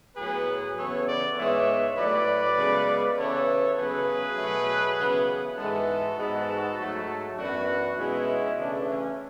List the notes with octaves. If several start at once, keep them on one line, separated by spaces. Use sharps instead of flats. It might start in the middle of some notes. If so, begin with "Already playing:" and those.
A2 F#3 B3 G#4 B4
C#3 E3 B3 A4 C#5
B4 D5
G#2 E3 G#3 B3 C#5 E5
A2 F#3 A3 B4 D5
C#3 G#3 B3
C#3 E3 B3 A4 C#5
C#3 F#3 B3 G#4 B4
B2 F#3 A3
C#3 E3 B3
G#2 E3 G#3 B3 F#4 A4
G#2 G#3 B3
G#2 F#3 A3
F#2 E3 B3 D4 F#4
B2 G#3 B3 C#4 E4
C#3 E3 A3 D4
C#4